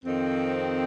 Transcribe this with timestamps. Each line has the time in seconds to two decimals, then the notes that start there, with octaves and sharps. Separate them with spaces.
0.04 F2 D#3 C4